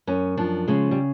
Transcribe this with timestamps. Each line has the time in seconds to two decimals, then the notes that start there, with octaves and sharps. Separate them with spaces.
0.07 F#2 C#4
0.37 F3 D4
0.68 C#3 G#3
0.91 G3